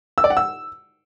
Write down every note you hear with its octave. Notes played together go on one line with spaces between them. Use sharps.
E6
D5
F#5
E6